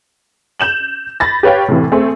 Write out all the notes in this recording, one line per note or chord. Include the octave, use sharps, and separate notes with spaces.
G6 E7 F#7
B5 A6 A#6
G4 B4 C#5 F5 G5
A2 C3 E3
A3 C4 G#4